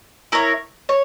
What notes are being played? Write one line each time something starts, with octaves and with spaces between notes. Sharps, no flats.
E4 A#4 C#5
C#5